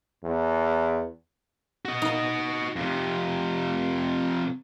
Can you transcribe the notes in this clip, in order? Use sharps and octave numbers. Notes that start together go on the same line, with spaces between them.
E2
F#4 D#5
D#4
F2 C3